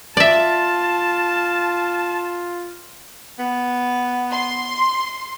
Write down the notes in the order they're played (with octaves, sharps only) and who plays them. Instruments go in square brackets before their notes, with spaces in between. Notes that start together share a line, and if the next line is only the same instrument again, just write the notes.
[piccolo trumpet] F4 [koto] D5 E5 [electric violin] A5
[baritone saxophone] B3
[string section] C6